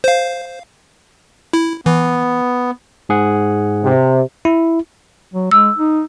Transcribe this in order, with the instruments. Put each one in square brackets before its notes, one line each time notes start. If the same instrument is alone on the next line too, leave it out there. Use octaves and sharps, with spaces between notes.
[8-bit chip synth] C5 F5
E4
[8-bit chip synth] E3 [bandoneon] B3
[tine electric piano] G#2 G#4 F#5
[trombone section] C3
[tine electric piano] E4
[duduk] F#3
[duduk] G#3 [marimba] E6
[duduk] D#4